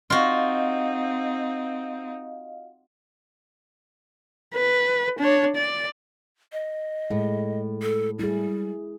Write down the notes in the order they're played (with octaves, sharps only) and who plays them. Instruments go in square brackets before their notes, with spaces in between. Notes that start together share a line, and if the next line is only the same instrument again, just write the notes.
[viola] C4 D#4 [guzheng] F4 F#4 [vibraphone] D#5 F5
[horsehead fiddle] B4
D4 C#5
D5
[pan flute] D#5
[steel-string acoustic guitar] A2 [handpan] G#3
[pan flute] A4
[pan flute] G3 [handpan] E4 G#4